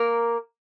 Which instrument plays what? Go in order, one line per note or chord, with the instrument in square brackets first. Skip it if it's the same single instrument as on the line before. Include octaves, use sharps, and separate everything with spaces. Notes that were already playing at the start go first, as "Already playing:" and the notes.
Already playing: [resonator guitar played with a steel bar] A#3 A#4